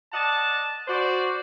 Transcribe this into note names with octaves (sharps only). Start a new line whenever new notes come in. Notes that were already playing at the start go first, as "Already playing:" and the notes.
D5 D#5 F#5 A5
F#4 C5 D5